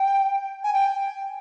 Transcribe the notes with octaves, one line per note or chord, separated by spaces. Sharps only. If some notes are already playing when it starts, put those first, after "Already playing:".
Already playing: G5
G#5
G5